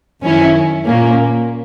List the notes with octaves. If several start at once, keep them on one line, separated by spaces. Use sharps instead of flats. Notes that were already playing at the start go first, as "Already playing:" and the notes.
F#2 D#3 F#3 C#4 E4
A#2 A#3 C#4